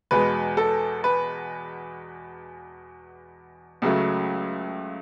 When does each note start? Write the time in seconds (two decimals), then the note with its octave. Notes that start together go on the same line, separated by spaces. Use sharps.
0.11 E2 B2 G#3 B4
0.57 A4
1.04 B4
3.82 C#2 C#3 F#3 A3